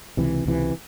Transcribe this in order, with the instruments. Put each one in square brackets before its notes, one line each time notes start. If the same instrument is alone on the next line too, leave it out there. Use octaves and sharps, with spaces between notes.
[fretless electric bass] C#2 C3 E3
C#2 C3 E3